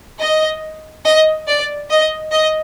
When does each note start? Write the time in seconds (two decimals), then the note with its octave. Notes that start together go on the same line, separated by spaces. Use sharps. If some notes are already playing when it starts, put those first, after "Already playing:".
0.21 D#5
1.05 D#5
1.47 D5
1.90 D#5
2.32 D#5